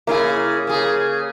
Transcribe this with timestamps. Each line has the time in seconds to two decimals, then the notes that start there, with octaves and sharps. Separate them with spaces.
0.07 C#3 A#3 E4 G#4
0.67 C#3 G#4